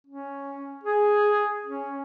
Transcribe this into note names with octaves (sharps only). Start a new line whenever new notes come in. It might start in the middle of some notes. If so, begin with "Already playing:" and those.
C#4
G#4
C#4